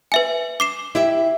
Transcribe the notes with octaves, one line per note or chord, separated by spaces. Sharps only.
B4 E5 G#5
D6 C7 E7
E4 G4 E5